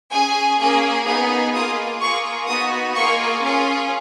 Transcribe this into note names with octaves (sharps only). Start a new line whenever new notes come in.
C#4 G#4 G#5
A#3 C#4 G#4
B3 D#4 G#4
A#3 F4 G#4 D#6
A#3 F4 G#4 C#6
B3 D#4 F#4 D#6
A#3 F4 G#4 C#6
C#4 F4 G#4